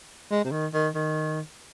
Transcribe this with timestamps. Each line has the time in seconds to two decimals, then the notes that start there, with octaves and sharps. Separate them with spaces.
0.31 G#3
0.44 C3
0.52 D#3
0.73 D#3
0.95 D#3